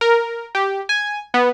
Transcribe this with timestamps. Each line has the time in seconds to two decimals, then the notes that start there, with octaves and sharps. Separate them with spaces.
0.01 A#4
0.55 G4
0.89 G#5
1.34 B3